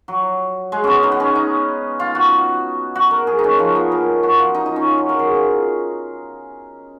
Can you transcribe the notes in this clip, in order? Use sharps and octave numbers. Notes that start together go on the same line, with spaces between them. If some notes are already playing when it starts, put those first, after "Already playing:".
F#3
G#3
B3 C#4
D#4
B3
C#4
D#4
F4
F#4
F#4
A#4
G#4
D#4
C#4
F3
B3
A#4
F#4
F4
D#4
D#4
C#4
F4
F#4
A#4
G#4
F4